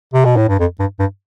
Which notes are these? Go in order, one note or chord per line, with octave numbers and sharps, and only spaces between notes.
C3
B2
A2
G2
F2
G2
G2